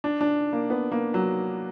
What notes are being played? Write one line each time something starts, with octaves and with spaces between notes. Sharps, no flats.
D4
D4
A#3
B3
A#3
F#3